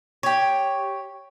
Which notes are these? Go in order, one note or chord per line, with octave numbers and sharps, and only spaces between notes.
G4 C#5